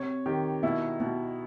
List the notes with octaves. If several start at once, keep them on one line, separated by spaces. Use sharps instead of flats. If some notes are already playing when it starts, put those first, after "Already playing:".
Already playing: C3 C#5
D#3 G4
B2 E4
B2